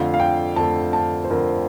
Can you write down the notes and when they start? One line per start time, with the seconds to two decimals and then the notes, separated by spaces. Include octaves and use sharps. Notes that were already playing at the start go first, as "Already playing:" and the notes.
Already playing: F2 D3 A3 F5
0.14 F5
0.20 G5
0.56 F2 D3 A3 A5
0.93 A5
1.24 C5
1.30 F2 D3 A3 A#4